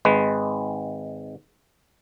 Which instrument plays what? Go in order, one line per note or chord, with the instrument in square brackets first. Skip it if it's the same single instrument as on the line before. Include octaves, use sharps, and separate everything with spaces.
[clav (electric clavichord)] G#1 G#3 B4